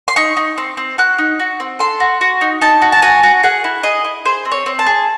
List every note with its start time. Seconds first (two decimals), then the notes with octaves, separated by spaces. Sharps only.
0.08 C6
0.16 D#4 C#6
0.37 D#4
0.58 C4
0.77 C4
0.98 F#4 F#6
1.18 D#4
1.39 F#4
1.60 C4
1.79 A4 C6
2.00 F#4
2.21 F#4
2.41 D#4
2.61 D#4 A5
2.82 F#4
2.92 A5
3.02 F#4 G#5
3.23 F#4
3.43 G#4 F#5
3.64 E4
3.83 G#4 D#5
4.05 E4
4.25 G#4 C5
4.45 C4
4.51 C#5
4.66 C4
4.79 A5
4.86 G#4